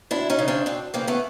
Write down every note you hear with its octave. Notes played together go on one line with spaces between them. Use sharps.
D2 D4 E4
C#4 D#4
C#3 E3
C4 D4
D2 C4 D4
C#3 E3 A#3 C4
A3 B3